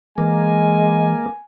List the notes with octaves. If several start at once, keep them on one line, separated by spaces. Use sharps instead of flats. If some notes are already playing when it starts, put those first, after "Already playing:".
E3 G#3 A#3 G#5